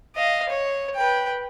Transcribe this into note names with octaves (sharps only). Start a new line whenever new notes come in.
D#5 F5
C#5
B4 G5